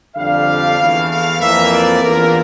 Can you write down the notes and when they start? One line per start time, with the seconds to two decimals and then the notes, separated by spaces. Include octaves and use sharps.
0.16 F2 D3 G3 D4 F5
0.78 E2 E3 A3
1.09 F5
1.39 F2 E3 A#3 E5
1.71 D5
2.01 E2 E3 A#3 D4 F4 A#4